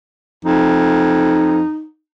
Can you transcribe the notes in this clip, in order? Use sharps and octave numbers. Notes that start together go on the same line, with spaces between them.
F2 D#4